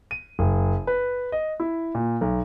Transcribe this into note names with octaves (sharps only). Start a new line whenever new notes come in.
D#7
F#1
B4
D#5
E4
A#2
B1